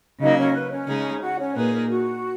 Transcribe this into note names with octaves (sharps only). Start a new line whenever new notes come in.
C#3 F#3 A#3 D#4 D#5
C#4 C#5
B4
C#4 C#5
C#3 G#3 D#4 G#4
F#4 F#5
C#4 C#5
A#2 A#3 D#4 G#4 B4
A#4
F#4